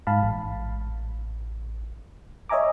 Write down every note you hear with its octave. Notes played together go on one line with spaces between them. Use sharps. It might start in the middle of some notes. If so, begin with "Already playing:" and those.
G#2 F5 A5 B5
A1
C#5 D#5 E5 G#5 A#5 D6